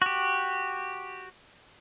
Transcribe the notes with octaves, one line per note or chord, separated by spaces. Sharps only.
F#4 G4